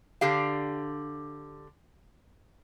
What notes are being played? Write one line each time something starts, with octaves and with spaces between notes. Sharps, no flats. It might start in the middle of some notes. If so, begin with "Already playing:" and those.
D3 D4 G4 F5